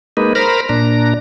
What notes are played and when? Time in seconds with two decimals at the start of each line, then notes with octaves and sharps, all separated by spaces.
0.17 G#3 A#3 D#4 B4
0.35 A#4 C5 A#5 B5 F6
0.69 A#2 D4 A#5